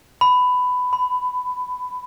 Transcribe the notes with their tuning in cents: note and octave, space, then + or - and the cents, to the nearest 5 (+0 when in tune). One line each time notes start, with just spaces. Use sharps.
B5 +15
B5 +30